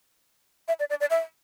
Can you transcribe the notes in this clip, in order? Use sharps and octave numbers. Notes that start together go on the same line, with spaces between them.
E5
D5
D5
D5
E5